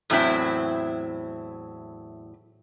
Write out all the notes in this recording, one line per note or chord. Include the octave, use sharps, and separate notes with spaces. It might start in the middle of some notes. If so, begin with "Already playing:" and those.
E2 A2 F#3 C4 E4